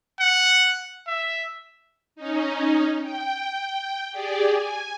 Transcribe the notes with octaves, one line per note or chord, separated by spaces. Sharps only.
F#5
E5
C#4 D#4
G5
G4 G#4 D5
G#5